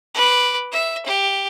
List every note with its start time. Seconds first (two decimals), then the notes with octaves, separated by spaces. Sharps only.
0.14 B4 D6
0.72 E5
1.06 G4